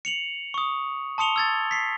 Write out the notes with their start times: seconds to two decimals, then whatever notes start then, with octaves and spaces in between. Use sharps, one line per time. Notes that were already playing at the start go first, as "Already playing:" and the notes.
0.05 C#7 F7 F#7
0.54 C#6 D#6
1.18 A5 C6 D#6 C#7 F7 G7
1.36 E6 G#6 A6
1.71 B6 C7